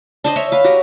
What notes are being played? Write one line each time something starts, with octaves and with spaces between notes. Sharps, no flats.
D4 C5 D#5
C#5 E5
B4 F5
F#4 G4 A#5